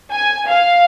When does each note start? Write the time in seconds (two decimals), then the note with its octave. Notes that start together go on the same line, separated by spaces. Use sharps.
0.12 G#5
0.49 F5